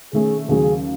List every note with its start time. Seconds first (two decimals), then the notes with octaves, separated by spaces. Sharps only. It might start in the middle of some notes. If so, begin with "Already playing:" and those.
0.13 D#3 A3 C#4 G#4
0.49 D#2 C#3 F#3 G#4